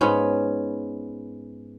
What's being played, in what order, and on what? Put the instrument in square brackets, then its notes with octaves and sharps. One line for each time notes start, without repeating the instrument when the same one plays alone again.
[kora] G#2 B3 C#4